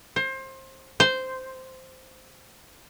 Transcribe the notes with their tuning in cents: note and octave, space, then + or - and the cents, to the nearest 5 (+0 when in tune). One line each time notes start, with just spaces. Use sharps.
C5 +25
C5 -10